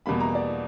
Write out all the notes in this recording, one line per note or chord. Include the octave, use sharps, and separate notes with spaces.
E2 B2 G3 A#3 B5
A#5
D5